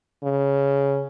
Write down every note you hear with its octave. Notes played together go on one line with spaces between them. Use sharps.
C#3